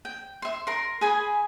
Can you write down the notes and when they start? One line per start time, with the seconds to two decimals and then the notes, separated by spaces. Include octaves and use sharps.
0.05 G5
0.42 E5 C6
0.67 A#4 C6
1.01 G#4 G#5 B5